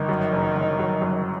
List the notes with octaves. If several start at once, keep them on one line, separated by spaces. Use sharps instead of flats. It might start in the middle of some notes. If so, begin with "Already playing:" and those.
Already playing: G1 D#3
F#2
F#1
F#1
F#3
F#2